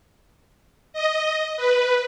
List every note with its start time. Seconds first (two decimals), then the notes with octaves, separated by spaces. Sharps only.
0.93 D#5
1.57 B4